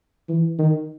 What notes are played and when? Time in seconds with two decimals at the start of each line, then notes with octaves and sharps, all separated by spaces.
0.29 E3
0.59 D#3